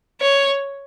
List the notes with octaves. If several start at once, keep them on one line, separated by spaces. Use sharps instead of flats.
C#5